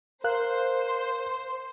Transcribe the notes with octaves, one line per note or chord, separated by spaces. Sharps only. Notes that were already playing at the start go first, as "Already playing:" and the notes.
A#4 C5 F5 F#6